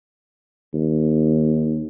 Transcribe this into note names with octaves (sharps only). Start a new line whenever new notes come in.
D#2